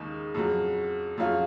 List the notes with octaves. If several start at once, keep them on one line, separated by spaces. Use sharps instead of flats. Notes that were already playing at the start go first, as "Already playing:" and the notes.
Already playing: D#2 C#3 G#3 D#4
F2 C#3 F#3
F2 C#3 F#3 C#4 F4